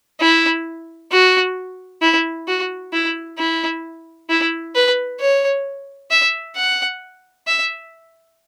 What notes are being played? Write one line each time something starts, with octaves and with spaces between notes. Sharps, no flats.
E4
F#4
E4
F#4
E4
E4
E4
B4
C#5
E5
F#5
E5